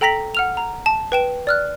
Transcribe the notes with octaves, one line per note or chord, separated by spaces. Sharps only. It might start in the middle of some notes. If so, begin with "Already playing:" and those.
A4 G5 A#5 A#6 B6 F#7
F#5 F6 F7
A#5
A5
B4 G5 E7
D5 F6 F#6